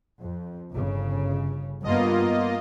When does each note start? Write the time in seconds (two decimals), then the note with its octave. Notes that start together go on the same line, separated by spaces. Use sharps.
0.21 F2
0.71 G1 C#3
1.84 G2 A#3 B3 F4 D#5